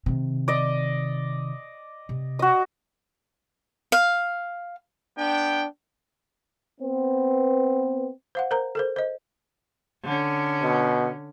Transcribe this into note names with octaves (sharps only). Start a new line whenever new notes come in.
C3 D#3
D5 D#5
C3
F#4 D#5
F5
B3 D4 G5
B3 C4
C5 F5 F#5
A#4 C5 A#5
A4 A#4 C5
C5 D#5
D3 C#4
B2